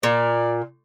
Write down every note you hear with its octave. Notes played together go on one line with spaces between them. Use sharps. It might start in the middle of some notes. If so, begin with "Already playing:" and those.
A#2 D5